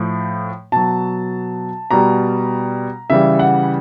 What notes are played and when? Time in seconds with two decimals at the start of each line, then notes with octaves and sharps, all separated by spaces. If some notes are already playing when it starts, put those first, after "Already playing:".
Already playing: A2 F3
0.72 B2 F#3 A5
1.91 B2 G3 A#5
3.10 C#3 E3 G3 E5
3.39 F#5